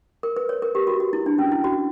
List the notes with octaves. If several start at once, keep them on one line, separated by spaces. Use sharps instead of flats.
A#4
B4
C#5
A#4
G4
F#4
F#4
E4
D4
C#4
E4
F#4